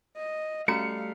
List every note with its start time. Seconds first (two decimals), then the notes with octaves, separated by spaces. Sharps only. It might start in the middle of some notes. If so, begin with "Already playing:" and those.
0.17 D#5
0.68 G3 A3 C#4 F#4 F5 A#5 C#7